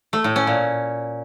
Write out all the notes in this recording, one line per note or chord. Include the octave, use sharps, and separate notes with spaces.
A3
A2
C#4
A#2